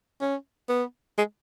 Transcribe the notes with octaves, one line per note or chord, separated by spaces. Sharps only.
C#4
B3
G#3